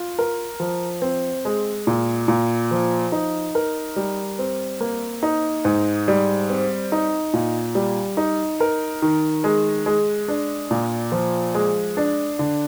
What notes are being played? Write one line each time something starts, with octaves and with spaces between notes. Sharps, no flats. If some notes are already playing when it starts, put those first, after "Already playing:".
Already playing: F4
A#4
F3
C4
G#3
A#2
A#2
F3
D#4
A#4
G3
C4
A#3
D#4
G#2
G3
C4
D#4
A#2
G3
D#4
A#4
D#3
G#3
G#3
D4
A#2
F3
G#3
D4
D3